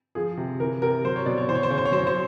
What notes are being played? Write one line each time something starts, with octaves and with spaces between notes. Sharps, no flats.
F3 G#4
C3
E3 A#4
C3 A#4
F#3 C5
C#5
B2 D5
C#5
E3 C5
C#5
C5
C#3 C#5
C5
C#5
F#3 C5
C#5
C5